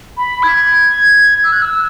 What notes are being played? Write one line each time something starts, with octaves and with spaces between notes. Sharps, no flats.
B5
G#6
E6
F#6
E6